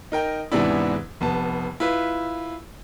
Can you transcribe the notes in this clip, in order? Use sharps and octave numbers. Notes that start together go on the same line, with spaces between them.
D#4 A#4 G5
E2 G#2 C3 B3 D4 E4
F1 B3 A5
E4 F4 B4